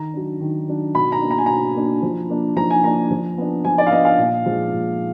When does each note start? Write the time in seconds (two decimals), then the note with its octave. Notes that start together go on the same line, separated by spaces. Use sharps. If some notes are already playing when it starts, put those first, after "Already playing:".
Already playing: D#3 A#5
0.14 F#3 D4
0.40 D#3
0.68 F#3 D4
0.95 B2 B5
1.12 A#5
1.21 A#3 D4
1.31 A#5
1.38 G#5
1.46 B2 A#5
1.76 A#3 D4
2.02 F3
2.29 A#3 D4
2.56 F3 A#5
2.70 G#5
2.83 A#3 D4 A#5
3.11 F3
3.38 B3 D4
3.65 F3 G#5
3.78 D5
3.87 F5
3.91 B3 D4 D#5
4.05 F5
4.18 A#2
4.46 F3 G#3
4.73 A#2